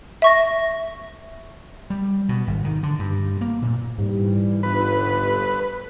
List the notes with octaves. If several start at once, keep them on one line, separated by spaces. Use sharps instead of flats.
E5 C#6 A#6
G3
B2
G#1
D#3
D3
G2
A#3
A#2
G#2 E3 G3
G1 B4